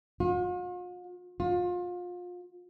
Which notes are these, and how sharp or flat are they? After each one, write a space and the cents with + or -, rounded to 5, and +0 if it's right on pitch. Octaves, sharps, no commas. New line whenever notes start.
F4 +45
F4 +30